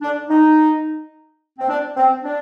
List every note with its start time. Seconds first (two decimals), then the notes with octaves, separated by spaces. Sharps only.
0.01 D4
0.29 D#4
1.58 C4
1.69 D4
1.97 C4
2.24 D4